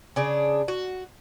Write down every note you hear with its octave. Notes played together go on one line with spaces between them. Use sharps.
C#3 D4 G#4
F#4